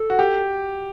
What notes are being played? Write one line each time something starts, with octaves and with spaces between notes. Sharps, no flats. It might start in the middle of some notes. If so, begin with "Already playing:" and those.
Already playing: A4
F#4
G4